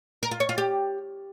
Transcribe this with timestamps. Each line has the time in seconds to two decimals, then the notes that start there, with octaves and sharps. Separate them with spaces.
0.23 A#4
0.31 F4
0.40 C#5
0.49 F4
0.58 G4